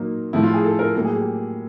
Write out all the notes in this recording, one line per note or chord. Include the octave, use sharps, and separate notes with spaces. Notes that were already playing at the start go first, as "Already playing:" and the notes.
Already playing: A#2 F#3 A#3 D#4
A2 F3 A3 E4
F4
G#4
A4
A#4
A2 F#3 A#3 A4
G#4
G4